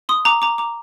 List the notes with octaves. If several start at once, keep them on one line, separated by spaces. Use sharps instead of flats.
C6 D#6
A#5 D6
A#5 D6
A#5 D6